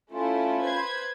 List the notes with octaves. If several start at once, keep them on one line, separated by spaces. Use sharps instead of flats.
A3 C#4 E4 F4
B4 C5 G#6